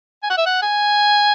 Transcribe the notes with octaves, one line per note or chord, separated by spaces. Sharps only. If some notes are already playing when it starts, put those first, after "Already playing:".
G#5
F#5
E5
F#5
G#5